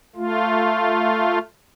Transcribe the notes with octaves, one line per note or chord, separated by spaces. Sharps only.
A3 F4